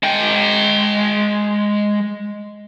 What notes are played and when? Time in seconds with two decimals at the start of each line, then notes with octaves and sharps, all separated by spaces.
0.03 G#3 G5